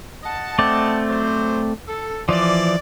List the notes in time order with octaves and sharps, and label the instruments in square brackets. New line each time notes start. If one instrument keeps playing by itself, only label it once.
[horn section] D#5 F#5 A5
[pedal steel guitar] A3 C4 D5
[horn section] F#3 C5
A4
[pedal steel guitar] E3 F3 [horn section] D5